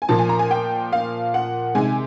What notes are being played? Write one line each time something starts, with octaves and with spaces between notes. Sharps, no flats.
G#5
A#2 F3 A#3 A5
G#5
A#5
G#5
G5
F5
F#5
C3 D#3 G#3 G#5